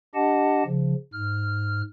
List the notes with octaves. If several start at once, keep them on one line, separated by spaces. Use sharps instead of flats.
D4 G4 D#5 F#5 A5
C#3 F3
G#2 F6